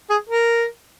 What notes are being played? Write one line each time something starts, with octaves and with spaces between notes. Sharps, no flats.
G#4
A#4